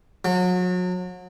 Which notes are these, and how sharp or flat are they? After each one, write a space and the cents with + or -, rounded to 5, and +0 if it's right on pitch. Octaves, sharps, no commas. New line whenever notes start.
F#3 -35